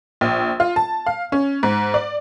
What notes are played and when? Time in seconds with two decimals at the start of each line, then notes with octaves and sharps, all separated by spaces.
0.21 A#1
0.60 F4
0.76 A5
1.06 F5
1.32 C#4
1.63 G#2
1.94 D5